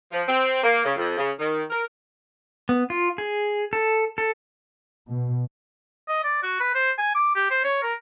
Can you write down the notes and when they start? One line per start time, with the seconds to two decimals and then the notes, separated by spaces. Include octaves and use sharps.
0.12 F3
0.27 C4
0.63 A#3
0.85 C#3
0.96 F2
1.17 C#3
1.39 D#3
1.70 A#4
2.69 B3
2.90 F4
3.18 G#4
3.73 A4
4.18 A4
5.07 B2
6.08 D#5
6.24 D5
6.43 F#4
6.60 B4
6.74 C5
6.98 G#5
7.15 D6
7.36 G4
7.50 C5
7.64 C#5
7.83 A#4